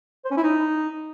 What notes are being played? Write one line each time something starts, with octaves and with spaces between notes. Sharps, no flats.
C5
C#4
E4
D#4